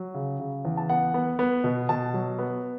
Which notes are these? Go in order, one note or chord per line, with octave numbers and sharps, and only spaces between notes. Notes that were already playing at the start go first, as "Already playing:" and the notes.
Already playing: F#3
C#3
C#3
E2
A5
B3 F#5
B3
B3
B2
B2 A5
F#3
B3